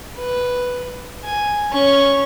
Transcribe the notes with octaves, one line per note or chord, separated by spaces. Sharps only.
B4
G#5
C#4 C#6